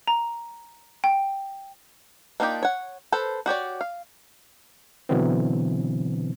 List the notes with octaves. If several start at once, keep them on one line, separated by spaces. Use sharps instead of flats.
A#5
G5
A#3 D4 D#4 F4 G4
C#5 F#5
A4 B4 C5
F#4 G4 C#5 D5
F5
B2 D3 E3 F#3 B3 C4